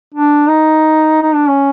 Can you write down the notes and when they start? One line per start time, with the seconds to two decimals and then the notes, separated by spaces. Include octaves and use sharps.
0.14 D4
0.48 D#4
1.22 D#4
1.34 D4
1.48 C#4